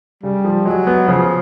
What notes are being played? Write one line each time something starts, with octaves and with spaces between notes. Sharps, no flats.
C#3 G3
F3
F#3 G#3
B3
C#3 F3